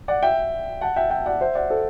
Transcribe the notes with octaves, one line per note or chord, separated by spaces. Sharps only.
D5 F#5
E5 G5
F#5 A5
E5 G5
E5 G5
D5 F#5
C5 E5
D5 F#5
A4 C5